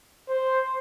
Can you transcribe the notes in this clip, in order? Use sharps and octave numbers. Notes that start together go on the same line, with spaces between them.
C5